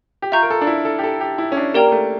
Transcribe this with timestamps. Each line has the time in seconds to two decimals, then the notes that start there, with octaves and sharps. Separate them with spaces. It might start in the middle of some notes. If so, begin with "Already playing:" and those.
0.22 G4
0.32 F4 E5 A#5 C#6 G6
0.43 A#4
0.50 A4
0.61 D4
0.67 E4
0.85 A4
0.99 G4
1.04 A4
1.21 G4
1.38 E4
1.52 C#4
1.57 D4
1.74 A#3 G4 A#4 D5 G5 A#5
1.92 A3